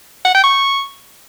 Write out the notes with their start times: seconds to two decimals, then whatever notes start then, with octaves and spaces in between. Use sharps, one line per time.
0.25 F#5
0.34 G5
0.44 C#6